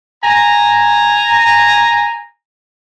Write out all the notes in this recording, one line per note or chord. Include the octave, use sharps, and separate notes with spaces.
G#5 A#5